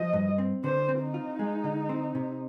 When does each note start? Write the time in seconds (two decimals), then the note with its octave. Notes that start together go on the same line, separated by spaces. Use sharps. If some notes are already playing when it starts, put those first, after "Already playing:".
Already playing: F3 D#5
0.13 G2
0.38 C4
0.64 D3 C5
0.89 C4
1.01 D#4
1.14 F4
1.39 G#3
1.64 D3
1.89 C4
2.15 C3